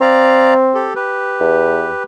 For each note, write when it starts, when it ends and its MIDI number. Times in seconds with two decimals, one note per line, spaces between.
0.01 0.90 60
0.01 0.54 74
0.01 0.54 77
0.01 0.54 82
0.75 0.94 67
0.75 0.94 69
0.96 2.03 67
0.96 2.03 71
1.40 1.90 40